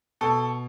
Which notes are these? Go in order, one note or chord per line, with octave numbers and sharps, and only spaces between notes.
B2 A4